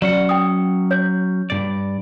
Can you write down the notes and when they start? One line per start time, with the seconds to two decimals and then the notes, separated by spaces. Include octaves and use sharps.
0.02 F#3 C#4 D5 F#5
0.29 G5 D#6
0.91 C#5 G6
1.50 G2 A#2 D5